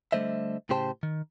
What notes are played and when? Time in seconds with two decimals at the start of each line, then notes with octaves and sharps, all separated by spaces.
0.12 D3 G3 A3 C5 D#5 E5
0.69 A2 C#3 G4 C5 G5 A5
1.03 D#3